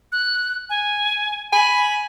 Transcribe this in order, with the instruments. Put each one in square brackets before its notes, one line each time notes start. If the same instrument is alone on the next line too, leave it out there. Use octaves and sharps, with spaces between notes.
[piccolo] F#6
G#5
[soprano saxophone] G#5 [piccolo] B5